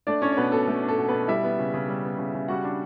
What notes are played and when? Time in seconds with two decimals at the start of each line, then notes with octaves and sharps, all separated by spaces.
0.07 A3 D4 D5
0.22 C#4 D4 C#5
0.32 C#5
0.37 B2 B3 B4
0.52 B2 A4
0.67 A3 A4
0.82 D4
0.88 A4
0.98 B2
1.09 B2 B3 B4
1.28 G3 E4 E5
1.44 B3
1.59 C#3
1.74 C#3
1.88 G3
2.03 B3
2.18 C#3
2.34 C#3
2.48 G3 F#4 F#5
2.64 D4